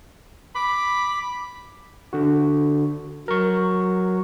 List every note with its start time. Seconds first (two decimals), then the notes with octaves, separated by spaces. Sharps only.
0.55 B5 D6
2.13 D3 F#4
3.28 F#3 A#4 C#6